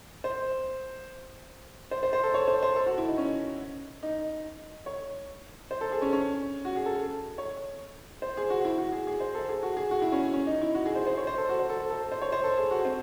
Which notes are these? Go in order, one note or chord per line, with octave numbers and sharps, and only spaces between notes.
C5
C5
C5
C5
A4
C#5
C5
C5
A4
F#4
E4
D#4
C#4
D#4
C#5
C5
A4
G#4
C#4
C#4
F#4
G#4
A4
C#5
C5
G#4
F#4
E4
F#4
G#4
G#4
C5
A4
G#4
F#4
G#4
F#4
E4
C#4
C#4
D#4
E4
F#4
G#4
C5
C5
C#5
C5
A4
F#4
C5
A4
A4
C5
C#5
C5
A4
G#4
F#4
C4